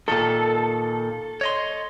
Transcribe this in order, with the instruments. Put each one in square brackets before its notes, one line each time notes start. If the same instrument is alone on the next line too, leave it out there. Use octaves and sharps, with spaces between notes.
[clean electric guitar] A#2 D#3 [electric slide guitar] A4
[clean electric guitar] C#5 D#5 C6